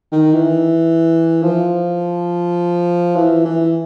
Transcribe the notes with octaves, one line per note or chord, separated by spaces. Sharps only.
D#3
E3
F3
E3
E3